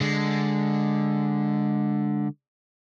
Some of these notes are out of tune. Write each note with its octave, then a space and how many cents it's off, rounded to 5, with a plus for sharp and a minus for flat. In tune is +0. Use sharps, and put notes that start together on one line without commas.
D3 +0 G#3 -10